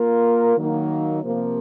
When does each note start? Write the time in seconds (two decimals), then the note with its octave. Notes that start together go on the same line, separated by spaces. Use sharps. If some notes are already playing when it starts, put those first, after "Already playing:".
Already playing: A#3 F4 A#4
0.56 D#3 F#3 A#3 D#4
1.22 C3 F3 A#3